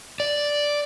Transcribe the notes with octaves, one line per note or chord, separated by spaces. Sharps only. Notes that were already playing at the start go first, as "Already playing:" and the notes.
D5